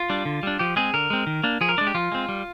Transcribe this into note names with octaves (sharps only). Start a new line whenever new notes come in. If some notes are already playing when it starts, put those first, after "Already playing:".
Already playing: F4
G3 D4
D3
G3 D4
F3 G4
G#3 C4 G#4
D3 A#4
G#3 C4
D#3
A#3 D4
F3 G#4
A#4
G#3 D4 D5
G4
F3 F4
G#3 C4
G3